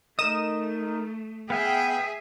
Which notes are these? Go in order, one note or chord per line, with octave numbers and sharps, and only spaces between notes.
A3 D#4 A#4 D#5 D#6 E7
B3 G#4 E5 F5 G5 G#5